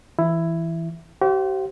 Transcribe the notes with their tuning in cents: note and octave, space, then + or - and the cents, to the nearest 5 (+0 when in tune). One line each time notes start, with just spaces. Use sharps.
E3 +0 E4 +10
G4 -40 C5 +10 F5 +0